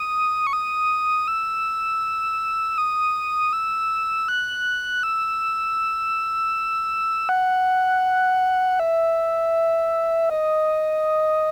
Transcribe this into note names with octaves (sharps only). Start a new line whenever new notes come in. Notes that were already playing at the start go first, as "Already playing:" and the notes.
Already playing: D#6
C#6
D#6
E6
D#6
E6
F#6
E6
F#5
E5
D#5